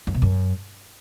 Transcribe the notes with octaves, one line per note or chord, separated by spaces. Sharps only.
F#2
B2
F#2